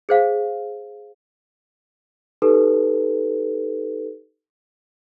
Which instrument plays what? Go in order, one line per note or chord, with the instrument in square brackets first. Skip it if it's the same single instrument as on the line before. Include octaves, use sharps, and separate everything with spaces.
[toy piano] G#4 C5 F5
[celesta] D#4 G4 A4 B4